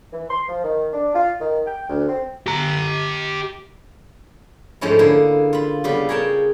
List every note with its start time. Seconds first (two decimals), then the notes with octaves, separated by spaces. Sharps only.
0.13 E3
0.30 C6
0.49 F3
0.64 D#3
0.93 D4
1.14 F4
1.41 D#3
1.66 G5
1.90 D2
2.08 C4
2.47 G4 A#5
4.81 G#2 F3 A3 C#4 D#4 E4
4.99 D3 A#3 E4 G#4
5.53 F4 B5
5.84 C#3 G3 B3 G4
6.09 G#4 A#4 C#5 G5 A5